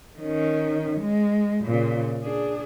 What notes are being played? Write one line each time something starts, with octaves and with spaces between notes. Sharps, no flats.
D#3 C#4
G#3
A#2 C#3
D4 G#4